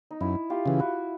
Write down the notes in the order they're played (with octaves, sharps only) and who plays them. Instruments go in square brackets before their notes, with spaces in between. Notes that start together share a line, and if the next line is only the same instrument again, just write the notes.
[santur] D#4
[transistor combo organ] F#2 [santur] E4
[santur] F4 G4
[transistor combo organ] C#3 E3
[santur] E4 F#4